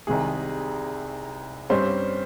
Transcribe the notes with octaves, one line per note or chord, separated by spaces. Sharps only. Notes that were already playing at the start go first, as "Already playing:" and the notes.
C2 C3 D#3 G#3 G#4
G2 G3 C4 C#4 C5